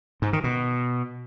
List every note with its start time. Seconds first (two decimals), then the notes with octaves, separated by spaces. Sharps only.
0.22 G#2
0.33 D#3
0.44 B2